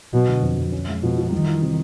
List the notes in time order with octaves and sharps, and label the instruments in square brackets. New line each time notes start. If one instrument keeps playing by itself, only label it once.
[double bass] B2 [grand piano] F#3
[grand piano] D3
F2
F2
C#4
G#3
[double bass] B2 [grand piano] F3
[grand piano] F3
[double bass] D#3 [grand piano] G3
[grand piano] E3
C3